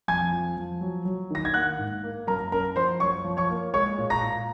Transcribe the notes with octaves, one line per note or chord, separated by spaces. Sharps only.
F2 G#5 G#6
F3
F3
F#3
F#3
D#3 A#6
G#6
A#3 F#5 F#6
G#2
A#3
F#2 A#4 A#5
C#4 A#4 A#5
F3 C5 C6
F#2 C#5 C#6
F3
C#5 C#6
A#3
G#3 C#5 C#6
A#2
A#5 A#6
A#2